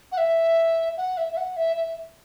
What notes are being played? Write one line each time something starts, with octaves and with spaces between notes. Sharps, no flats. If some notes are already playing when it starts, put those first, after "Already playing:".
F#5
E5
F#5
E5
E5
F#5
E5
E5